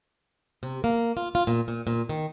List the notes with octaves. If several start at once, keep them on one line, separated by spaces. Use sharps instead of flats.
C3
A#3
F4
F4
A#2
A#2
A#2
D#3